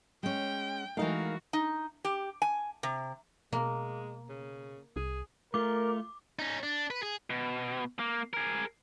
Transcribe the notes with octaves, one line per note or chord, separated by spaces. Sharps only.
G#3 C#4 G5
E3 G#3 A3 D#4 F#4 A#4 F5
D#4
G4
G#5
C3
B2 G#3 A#3
C#3
C2 G#4
A3 F4 A#4 D6
C#4 D#4
D4
B4
G#4
B2
A#3
G#4 A#4